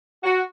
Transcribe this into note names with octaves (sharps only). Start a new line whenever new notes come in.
F#4